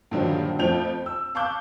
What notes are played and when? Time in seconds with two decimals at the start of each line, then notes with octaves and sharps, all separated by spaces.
0.11 G2 A#2 D3 D#3 F3 F#3
0.59 F2 F3 A3 G6 F7
1.06 E6
1.35 F5 A5 C#6 D6 F#6 G6